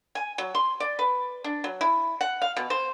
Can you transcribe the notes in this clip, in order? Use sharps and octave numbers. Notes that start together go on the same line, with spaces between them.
G#5
F#3
C6
D5
B4
D4
F#3
E4
F#5
F5
B2
C5